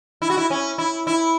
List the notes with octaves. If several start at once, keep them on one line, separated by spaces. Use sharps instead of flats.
E4
F#4
E4
C#4
E4
E4